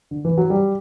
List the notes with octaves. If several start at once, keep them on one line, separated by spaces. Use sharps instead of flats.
D3
E3
F#3
G3